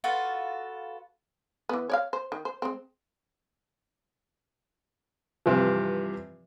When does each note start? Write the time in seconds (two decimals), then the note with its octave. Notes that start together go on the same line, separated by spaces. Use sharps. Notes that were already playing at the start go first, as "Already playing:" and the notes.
0.04 F4 F#4 A4 B4
1.69 E3 B3
1.90 C#5 D5 F5
2.13 C5
2.32 D#3
2.45 C5
2.62 G#3 C4
5.46 G2 C3 E3 F3